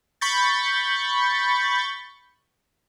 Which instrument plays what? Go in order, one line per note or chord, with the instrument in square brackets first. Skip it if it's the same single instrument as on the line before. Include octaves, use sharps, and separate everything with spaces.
[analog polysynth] B5 C#6 G6 A6